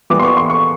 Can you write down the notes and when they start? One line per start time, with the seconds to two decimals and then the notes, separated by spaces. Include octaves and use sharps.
0.10 E3 G3 B3 D6
0.20 C6
0.23 C#6
0.37 C6
0.50 C#6